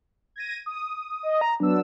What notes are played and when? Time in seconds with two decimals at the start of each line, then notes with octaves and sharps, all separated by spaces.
0.36 G#6 A#6 D#7
0.66 D#6
1.23 D#5
1.41 A#5
1.60 F#3 B3 D4 E6